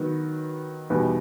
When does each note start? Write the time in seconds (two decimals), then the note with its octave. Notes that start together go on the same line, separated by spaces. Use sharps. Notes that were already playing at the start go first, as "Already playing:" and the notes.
Already playing: D#3 F#3 B3
0.90 E2 B2 G3 B3 D#4